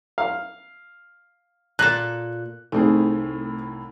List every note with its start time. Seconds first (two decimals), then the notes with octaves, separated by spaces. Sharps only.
0.18 F5
1.79 A#2 A4 F#6
2.72 C2 A2 A3 C4 D#4 G#4